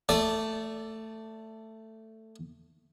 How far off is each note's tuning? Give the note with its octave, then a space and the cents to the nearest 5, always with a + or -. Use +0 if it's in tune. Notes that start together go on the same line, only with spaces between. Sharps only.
A3 +10 D5 -15